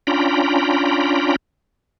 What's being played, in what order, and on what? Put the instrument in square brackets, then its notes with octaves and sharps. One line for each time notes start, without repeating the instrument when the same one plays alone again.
[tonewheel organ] C#4 D4 F4 G5 A#5 B5